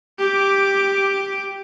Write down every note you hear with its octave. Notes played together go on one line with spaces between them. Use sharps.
G4 D6